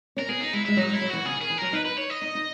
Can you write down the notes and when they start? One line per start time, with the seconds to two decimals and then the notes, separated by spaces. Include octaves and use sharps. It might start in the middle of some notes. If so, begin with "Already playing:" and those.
0.17 C#4 A#4
0.29 B3 G#4
0.41 D#4
0.53 G#3 E4
0.65 G#3 E4
0.77 F#3 D#4
0.89 G#3
0.93 E4
1.01 F#3
1.09 E3 F#4
1.25 C#3 G#4
1.37 D#3
1.41 G#4
1.50 E3
1.57 F#3 A#4
1.73 D#4 B4
1.85 B4
1.98 C#5
2.10 D#5
2.22 D#4
2.35 D#4